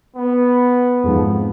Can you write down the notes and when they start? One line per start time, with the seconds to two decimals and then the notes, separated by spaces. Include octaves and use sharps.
0.16 B3
1.04 F2 G#2 F3